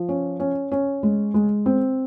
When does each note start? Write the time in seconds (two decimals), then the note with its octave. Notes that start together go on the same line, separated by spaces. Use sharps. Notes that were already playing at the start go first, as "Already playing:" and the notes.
Already playing: F3
0.09 C#4
0.40 C#4
0.72 C#4
1.03 G#3
1.34 G#3
1.66 C4